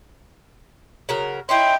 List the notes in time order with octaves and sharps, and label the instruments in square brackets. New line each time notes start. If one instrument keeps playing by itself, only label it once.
[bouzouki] C#3 F#3 A#4
[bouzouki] C#4 D#4 E4 [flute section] G5 C6